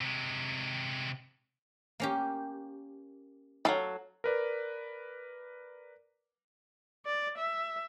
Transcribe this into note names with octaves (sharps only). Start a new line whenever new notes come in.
C3 G#3
A#3 C#4 G4
E3 F#3 A4 F5
A#4 B4 D5
D5
E5